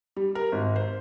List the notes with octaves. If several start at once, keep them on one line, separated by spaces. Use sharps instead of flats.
G3
A#4
G#1
C5